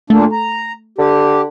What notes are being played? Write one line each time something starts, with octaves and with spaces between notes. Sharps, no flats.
A#2 A3 A#3 D4
A#5
D3 G4